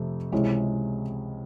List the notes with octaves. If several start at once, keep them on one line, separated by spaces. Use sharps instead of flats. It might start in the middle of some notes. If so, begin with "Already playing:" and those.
Already playing: F2 C3 A3
C#2 C3 E3 G#3 C#4